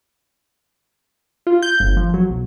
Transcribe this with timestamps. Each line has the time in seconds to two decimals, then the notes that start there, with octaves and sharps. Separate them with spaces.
1.47 F4
1.62 G6
1.80 G1
1.97 F3
2.14 F#3
2.30 B1